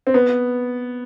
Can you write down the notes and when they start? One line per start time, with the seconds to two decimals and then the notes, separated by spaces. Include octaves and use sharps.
0.07 C4
0.14 B3